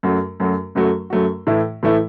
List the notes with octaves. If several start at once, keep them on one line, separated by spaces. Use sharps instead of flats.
F#2 F#3 A3 F#4
F#2 F#3 A3 F#4
F#2 F#3 A3 F#4
F#2 F#3 A3 F#4
A2 E3 A3 E4
A2 E3 A3 E4